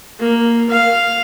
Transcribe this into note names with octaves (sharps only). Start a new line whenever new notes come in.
A#3
F5